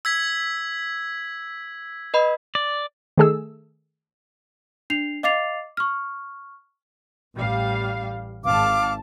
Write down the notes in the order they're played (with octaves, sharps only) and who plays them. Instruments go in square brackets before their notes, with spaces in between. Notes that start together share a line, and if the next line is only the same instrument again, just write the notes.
[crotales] E6 G#6 B6
[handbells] B4 D#5 B5
[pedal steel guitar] D5
[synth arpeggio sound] D#3 A3 G#4 A4 E6
[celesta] D4 C7 F7
D#5 F5 D6 A6 C7 F7
C#6 F6
[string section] A1 G3 F5
[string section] G#1 A5 [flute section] F5 D6